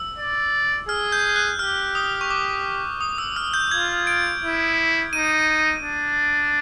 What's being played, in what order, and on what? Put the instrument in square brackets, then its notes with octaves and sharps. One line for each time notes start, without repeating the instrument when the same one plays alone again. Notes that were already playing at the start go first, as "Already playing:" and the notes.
Already playing: [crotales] E6
[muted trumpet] D5
[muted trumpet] G#4 [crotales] F6
[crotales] G6
F#6
[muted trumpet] G4 [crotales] F6
[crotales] D#6
C#6
D6
D#6
E6
F6
G6
[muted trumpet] F4 [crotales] G#6
[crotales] D7
[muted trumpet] E4
[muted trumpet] D#4 [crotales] D#7
[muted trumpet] D4